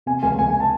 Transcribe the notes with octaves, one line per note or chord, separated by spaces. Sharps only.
C3 G#5
C#2 G#5
C#2 G#5
G#5
A5